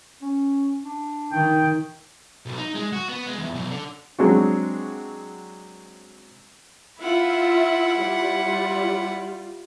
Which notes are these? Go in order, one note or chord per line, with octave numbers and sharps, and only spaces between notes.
C#4
D4
D#3 G5
B1
D#4
G#3
F#4
B3
G#3
E2
B1
D3
F#3 G#3 C4 D4 F#4
E4 F4 E5 F#5
G3 F4